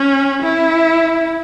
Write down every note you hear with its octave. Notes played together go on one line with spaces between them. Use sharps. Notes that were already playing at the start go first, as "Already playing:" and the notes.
Already playing: C#4
E4